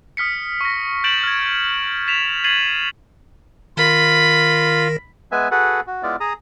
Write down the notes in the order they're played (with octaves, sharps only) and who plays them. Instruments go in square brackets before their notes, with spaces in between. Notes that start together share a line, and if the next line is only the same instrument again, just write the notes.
[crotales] D#6 F6 B6 C#7
C#6 A#6
G6 A6 D7 E7 F#7
F6 G#6
A6 B6 E7 F7
G#6 A6 C7 D#7 F#7
[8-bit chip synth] D#3 A#4 A#6 [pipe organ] F4 [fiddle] B5
[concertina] G#3 B3 B4 E5 G#5
F#4 G#4 A4 B4 F#5
F#4
G#3 B3 E4 F4 D5
G#4 A#5 D#6